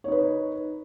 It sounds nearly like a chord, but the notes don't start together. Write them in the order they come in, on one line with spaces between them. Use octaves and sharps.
C#5 D#4 B4